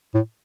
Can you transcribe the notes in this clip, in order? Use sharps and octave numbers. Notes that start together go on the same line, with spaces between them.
A2